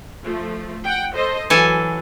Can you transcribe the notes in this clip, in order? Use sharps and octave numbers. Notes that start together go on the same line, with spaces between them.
F3 A3
F#5 G5
A4 C5 D#5
E3 F#3 A4 G#5